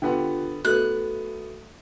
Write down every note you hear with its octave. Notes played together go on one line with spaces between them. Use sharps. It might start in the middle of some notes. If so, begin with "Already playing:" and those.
D3 B3 F4 G4 F#5 G5
A3 B3 D#4 F#4 A4 F#6